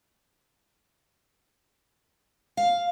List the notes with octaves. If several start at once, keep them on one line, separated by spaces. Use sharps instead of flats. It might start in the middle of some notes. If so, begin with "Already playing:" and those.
F5